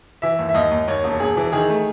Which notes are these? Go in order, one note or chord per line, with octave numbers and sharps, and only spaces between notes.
E3 E5
D#2
E5
D#2 D#5
D#2
D#2 C#5
E1
E1 G#4
E3
D#3 G#4
A3